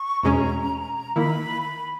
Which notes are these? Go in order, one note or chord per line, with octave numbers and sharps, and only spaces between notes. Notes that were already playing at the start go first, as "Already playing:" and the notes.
Already playing: C#6
E2 B2 G#3 C#4 A#5
D#3 A#3 E4 B5
B5